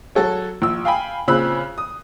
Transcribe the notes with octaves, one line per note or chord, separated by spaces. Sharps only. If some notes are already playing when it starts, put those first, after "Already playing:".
F#3 F#4 A4 C#5
A#1 E6
F5 G5 G#5 B5
A#2 C#3 C4 B5 E6 F#6
D#6